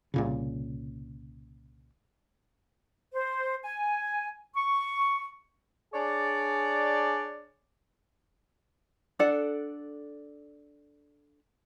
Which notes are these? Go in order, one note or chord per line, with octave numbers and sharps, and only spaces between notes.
C2 A#2 C#3
C5
G#5
C#6
D4 G#4 C#5 D5
D4 A4 D5 F#5